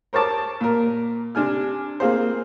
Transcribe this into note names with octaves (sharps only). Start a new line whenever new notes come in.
A#4 C5 C#5 A5 D6
A#2 A#4
C3 D4 G#5 F6
A#3 C4 F4 G#4 C5